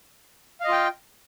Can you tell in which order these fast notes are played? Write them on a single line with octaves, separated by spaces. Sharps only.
F5 D#5 F4 G5